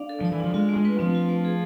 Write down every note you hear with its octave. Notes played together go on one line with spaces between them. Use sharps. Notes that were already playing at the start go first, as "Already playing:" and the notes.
Already playing: D4 D5 F5
A4
F3 D5
E3
F3 D4
G#3 F4
A3
G#3
B4
F3 C4
F4
A3
G#4